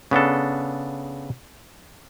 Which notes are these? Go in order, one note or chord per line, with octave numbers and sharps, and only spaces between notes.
C#3 B3 D4 A4